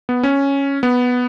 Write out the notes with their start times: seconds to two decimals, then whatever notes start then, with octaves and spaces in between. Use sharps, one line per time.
0.09 B3
0.23 C#4
0.83 B3